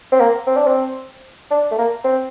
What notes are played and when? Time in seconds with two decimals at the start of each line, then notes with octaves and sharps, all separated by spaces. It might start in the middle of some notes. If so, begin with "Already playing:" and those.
0.12 C4
0.20 A#3
0.47 C4
0.57 D4
0.67 C4
1.51 D4
1.71 A3
1.78 A#3
2.04 C4